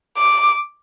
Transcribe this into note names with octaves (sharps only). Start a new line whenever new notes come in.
D6